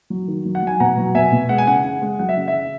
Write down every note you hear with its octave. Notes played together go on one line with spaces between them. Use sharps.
F#3
D#3
F#3
F#5
F#3 G#5
B2 F#5 A#5
F#3
B2 E5 G#5
B2
G#3 F#5
G#5
C#3 F#5
C#3
G#3
F#3 F#5
E5
C#3
E5
C#3